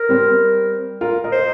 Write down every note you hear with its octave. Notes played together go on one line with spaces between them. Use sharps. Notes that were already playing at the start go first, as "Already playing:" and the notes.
Already playing: A#4
G3 C4
F4 A#4
A#4 D#5
C5
D#5